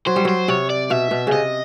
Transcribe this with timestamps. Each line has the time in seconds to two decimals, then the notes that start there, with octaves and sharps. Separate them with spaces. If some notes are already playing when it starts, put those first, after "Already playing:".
0.07 F#3 C5
0.16 G3
0.25 F#3 C5
0.48 C3 C#5
0.70 D5
0.90 B2 E5
1.11 B2
1.27 C#3
1.32 C3 D#5